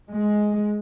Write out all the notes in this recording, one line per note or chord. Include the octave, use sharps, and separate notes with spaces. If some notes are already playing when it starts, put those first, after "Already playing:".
G#3